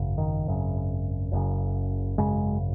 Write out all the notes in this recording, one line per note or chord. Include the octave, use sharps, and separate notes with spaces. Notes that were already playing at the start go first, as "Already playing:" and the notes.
Already playing: G#1 F#2 C#3
D#3
G#1 F#2 C#3
F#1 F#2 C#3
G#1 F#2 C#3 G#3